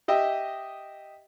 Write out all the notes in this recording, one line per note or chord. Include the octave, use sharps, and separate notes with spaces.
G4 D#5 E5 G5